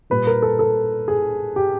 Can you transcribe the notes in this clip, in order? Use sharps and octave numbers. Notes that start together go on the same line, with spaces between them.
A#2 G3 B4
A#4
A4
A4
G#4
G4